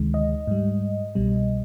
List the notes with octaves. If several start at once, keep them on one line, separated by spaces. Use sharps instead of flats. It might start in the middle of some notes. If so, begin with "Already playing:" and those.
Already playing: D2 C3 D#3 G#3
D#5
G#2 G3
C2 B2 G3